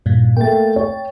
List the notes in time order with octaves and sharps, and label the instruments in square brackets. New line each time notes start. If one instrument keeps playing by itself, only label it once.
[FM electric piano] G2 A#2
[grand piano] A3 A#3 [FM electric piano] G5 A6
[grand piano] C#5